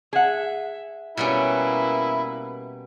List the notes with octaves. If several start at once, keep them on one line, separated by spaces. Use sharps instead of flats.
G#4 E5 F#5
B2 G3 A#3 C#4 E4 B4